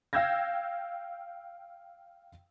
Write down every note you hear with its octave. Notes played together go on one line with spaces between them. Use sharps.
F5 G5 E6 G6 G#6 A#6